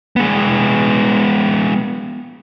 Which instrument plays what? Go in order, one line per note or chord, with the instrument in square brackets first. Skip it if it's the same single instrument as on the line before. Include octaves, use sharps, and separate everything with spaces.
[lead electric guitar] G#3 B3